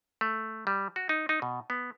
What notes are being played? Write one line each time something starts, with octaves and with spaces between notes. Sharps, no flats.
A3
G3
F#4
D#4
D#4
B2
B3